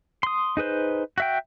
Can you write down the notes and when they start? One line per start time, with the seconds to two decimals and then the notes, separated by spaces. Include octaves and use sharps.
0.23 C6 D#6
0.57 D#4 G#4 B4 C5
1.18 F#4 E5 G5